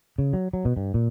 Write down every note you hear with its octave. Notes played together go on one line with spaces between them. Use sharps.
C#3
F#3
F#3
B2
G2
A#2